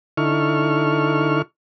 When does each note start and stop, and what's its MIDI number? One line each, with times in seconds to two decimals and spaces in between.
0.17 1.42 50
0.17 1.42 63
0.17 1.42 64
0.17 1.42 69
0.17 1.42 85
0.17 1.42 89